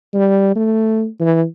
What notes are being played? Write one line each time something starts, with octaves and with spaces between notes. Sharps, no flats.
G3
A3
E3